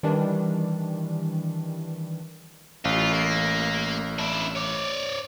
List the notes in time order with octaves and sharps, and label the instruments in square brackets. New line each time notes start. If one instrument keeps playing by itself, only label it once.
[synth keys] D#3 E3 G3 D4
[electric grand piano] A1 [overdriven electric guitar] F4
[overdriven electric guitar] A#3
D4 E4
C#5 D5